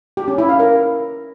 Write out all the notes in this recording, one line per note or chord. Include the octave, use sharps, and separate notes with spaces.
G4
C#4
E4
F5
A#4